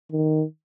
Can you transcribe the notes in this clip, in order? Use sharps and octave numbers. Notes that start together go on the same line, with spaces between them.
D#3